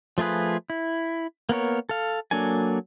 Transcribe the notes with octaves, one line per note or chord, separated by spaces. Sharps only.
F3 A3 F4 G#4 B4
E4
A#3 B3 A#4 C#5
A4 F5
F#3 A#3 D4 A4 G#5